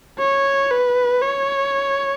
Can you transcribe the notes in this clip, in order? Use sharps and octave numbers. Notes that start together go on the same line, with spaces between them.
C#5
B4
C#5